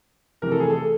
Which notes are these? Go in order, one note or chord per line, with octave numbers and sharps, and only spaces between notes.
C3 E3 A3 A#4
A4
G#4
A4